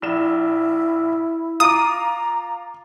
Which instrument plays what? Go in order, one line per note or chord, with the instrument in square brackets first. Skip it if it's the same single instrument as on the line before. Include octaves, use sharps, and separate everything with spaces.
[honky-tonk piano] A#1 E7 [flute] E4
[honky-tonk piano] F4 D6 [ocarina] A#5 [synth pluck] D#6